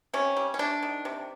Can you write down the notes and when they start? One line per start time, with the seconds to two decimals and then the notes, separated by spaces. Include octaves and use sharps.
0.13 C3 C#4
0.37 G3
0.54 C#4
0.59 C3 D4
0.83 D#3
1.05 C3